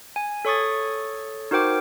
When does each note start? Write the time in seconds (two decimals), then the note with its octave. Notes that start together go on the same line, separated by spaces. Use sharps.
0.16 G#5
0.45 A4 C#5 C#6 D#6 A6
1.51 D#4 F#4 A#4 C5 G5 D6